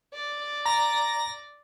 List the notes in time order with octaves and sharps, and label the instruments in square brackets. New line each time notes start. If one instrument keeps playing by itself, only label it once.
[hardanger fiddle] D5
[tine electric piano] A#5 [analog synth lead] A#6